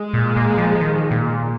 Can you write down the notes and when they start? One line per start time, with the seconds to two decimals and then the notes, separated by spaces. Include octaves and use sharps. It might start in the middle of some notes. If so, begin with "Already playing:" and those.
Already playing: G#3
0.14 A#2
0.37 A#3
0.58 F3
0.81 D#3
1.11 A#2